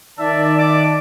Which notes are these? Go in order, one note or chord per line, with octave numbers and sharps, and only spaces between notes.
D#3 D5 E5 A5
D5 D6